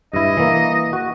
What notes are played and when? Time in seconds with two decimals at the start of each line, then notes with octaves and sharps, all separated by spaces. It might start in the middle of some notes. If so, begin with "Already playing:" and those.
0.13 G2 E4 D#5
0.37 E3 A#3
0.93 F#4